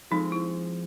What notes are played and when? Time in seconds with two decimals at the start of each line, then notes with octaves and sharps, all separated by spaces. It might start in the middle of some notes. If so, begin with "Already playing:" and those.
0.11 F3 G#3 C4 D#4
0.32 E4